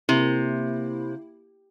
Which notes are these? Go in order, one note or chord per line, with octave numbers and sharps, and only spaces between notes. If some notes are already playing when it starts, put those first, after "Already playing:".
C3 A#3 E4